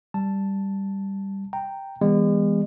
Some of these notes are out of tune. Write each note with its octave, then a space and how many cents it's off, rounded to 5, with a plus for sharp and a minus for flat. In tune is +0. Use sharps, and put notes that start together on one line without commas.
G3 +0 A5 +0
G5 +0 A#5 -15
E3 -5 G#3 -40 B3 +0